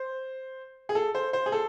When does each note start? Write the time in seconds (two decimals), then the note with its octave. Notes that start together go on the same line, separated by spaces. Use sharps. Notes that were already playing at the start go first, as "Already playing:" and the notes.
Already playing: C5
0.89 G#4
0.95 A4
1.15 C5
1.33 C5
1.46 G#4
1.52 A4